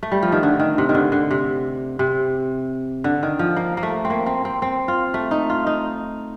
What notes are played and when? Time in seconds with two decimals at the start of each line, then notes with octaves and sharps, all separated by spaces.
0.03 A3
0.12 G3
0.22 F3
0.32 D#3
0.43 D3
0.59 D#3
0.78 C3
0.89 D#3
0.94 D3
1.12 D3
1.31 C3
1.99 C3
3.04 D3
3.23 D#3
3.39 F3
3.56 A#3
3.77 A#3
3.83 A3
4.05 C4
4.10 A#3
4.26 C4
4.45 C4
4.62 C4
4.88 F4
5.14 A3
5.31 D#4
5.50 F4
5.67 D#4